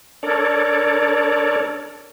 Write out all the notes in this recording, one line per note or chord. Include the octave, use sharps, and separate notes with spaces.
D4 A4 A#4 C#5 D5